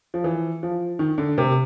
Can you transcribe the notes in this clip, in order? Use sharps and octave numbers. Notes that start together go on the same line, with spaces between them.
F3
E3
F3
D#3
D3
C3